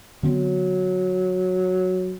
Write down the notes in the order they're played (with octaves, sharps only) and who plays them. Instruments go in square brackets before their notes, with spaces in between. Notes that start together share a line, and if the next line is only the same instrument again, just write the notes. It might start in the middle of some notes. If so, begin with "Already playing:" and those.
[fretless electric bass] D3 B3 C4 [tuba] F#3